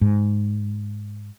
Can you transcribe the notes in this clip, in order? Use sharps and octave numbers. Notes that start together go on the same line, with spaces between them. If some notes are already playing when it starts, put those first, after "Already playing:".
G#2